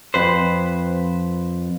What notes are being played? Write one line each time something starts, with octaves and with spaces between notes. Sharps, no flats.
F2 B4 C5